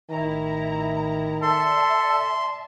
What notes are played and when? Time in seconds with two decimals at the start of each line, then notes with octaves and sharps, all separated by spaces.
0.11 A1 D#3 E4 A#5
1.42 A4 D5 E5 A5 C6